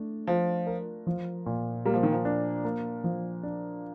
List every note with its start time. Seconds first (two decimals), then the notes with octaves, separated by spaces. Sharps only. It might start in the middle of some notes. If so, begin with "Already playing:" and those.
Already playing: A3 D4
0.27 F3 F4
0.67 A#4
1.07 F3
1.46 A#2
1.85 G3 A#3
1.94 F3
2.03 D#3
2.12 F3
2.25 D4
2.65 A#3
3.04 F3
3.43 D4